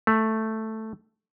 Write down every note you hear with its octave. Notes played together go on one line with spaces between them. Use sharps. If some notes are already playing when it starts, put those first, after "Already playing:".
A3